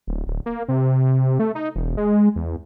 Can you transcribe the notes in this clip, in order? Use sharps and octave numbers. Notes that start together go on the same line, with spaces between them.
D1
D1
A#3
C3
A3
D#4
E1
G#3
E2